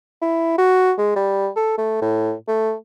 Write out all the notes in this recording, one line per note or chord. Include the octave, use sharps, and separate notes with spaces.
E4
F#4
G#3
G3
A4
A3
A2
A3